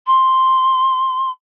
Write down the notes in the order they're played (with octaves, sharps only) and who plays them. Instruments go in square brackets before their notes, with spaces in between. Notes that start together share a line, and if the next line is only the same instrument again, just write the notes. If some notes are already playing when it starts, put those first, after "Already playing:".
[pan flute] C6